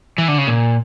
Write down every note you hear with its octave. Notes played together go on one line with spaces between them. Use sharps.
E3
D3
C#3
A#2